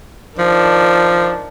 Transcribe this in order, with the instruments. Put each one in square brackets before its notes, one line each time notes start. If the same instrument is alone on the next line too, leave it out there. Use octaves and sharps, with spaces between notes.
[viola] D#3 D4 [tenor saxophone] F3